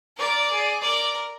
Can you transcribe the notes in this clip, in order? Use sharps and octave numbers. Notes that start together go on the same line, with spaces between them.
A#4 D5
G#4
A#4 D5